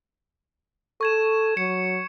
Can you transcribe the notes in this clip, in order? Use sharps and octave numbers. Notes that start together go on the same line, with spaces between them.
A4 C#6 G#6 E7
F#3 C#7